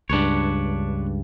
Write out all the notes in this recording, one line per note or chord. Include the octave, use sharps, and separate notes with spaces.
C#2 G2 D4 B4 C#5